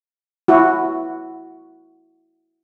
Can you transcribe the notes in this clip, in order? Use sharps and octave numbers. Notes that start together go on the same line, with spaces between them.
E4 F#4